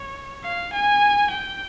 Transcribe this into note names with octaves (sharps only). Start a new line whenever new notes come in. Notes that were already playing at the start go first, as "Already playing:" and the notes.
Already playing: C#5
F5
G#5
G5